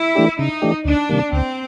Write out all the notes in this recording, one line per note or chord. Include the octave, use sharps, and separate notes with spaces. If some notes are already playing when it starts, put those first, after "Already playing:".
Already playing: E4
E3 A3 D4 G4
C#3 D#4
E3 A3 D4 G4
D2 D4
C3 D#3 G3 A#3
D2 C4